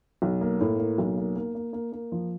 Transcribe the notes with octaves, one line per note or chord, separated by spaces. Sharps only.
B1
A#3
A2
A#3
B1
A#3
A#3
A#3
A#3
A#3
F3